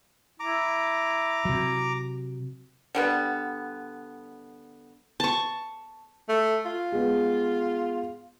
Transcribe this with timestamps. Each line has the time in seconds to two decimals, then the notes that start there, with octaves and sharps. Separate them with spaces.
0.40 E4 A#5 D6
1.45 C3 F#3
2.95 D3 G3 B3
5.20 A5 C#6
6.29 A3
6.65 F4
6.92 G#3 B3